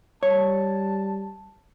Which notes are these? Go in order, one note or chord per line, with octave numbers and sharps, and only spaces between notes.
G3 C#5 A5